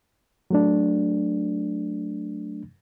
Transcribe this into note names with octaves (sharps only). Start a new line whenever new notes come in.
F#3 A3 D4